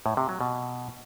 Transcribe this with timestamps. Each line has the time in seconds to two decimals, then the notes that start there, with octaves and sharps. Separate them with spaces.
0.06 A2
0.17 C3
0.29 F#3
0.41 B2